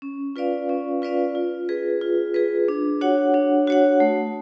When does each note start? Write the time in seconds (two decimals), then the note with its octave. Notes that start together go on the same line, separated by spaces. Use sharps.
0.02 C#4
0.36 F4 B4 D5 F5
0.69 C#4
1.02 F4 B4 D5 F5
1.35 F4
1.69 G#4 B4
2.01 F4
2.34 G#4 B4
2.68 D4
3.01 F#4 C#5 F#5
3.34 D4
3.67 F#4 C#5 F#5
4.00 A3